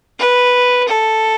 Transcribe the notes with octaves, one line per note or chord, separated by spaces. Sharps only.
B4
A4